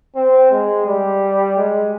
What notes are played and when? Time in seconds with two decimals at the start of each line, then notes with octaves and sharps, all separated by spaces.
0.16 C4
0.51 G#3
0.86 G3
1.56 G#3